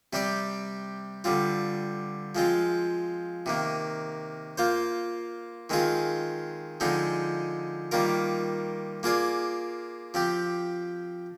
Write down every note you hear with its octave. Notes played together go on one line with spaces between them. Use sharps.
C3 G3 C4 G4 D5
D3 G3 C4 F4
F3 G#3 C4 F4
C3 D#3 A#3
A#3 F4 C5
D#3 G#3 C4 F4 G#4
D3 F3 G#3 C4 D#4
D#3 G3 A#3 F4 A#4
A#3 F4 G#4 D5
F3 C4 G4